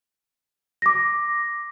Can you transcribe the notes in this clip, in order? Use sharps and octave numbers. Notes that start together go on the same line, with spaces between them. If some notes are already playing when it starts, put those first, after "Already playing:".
D6 A#6